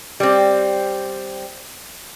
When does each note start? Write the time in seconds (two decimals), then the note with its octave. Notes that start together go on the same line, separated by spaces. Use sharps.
0.20 G3 C4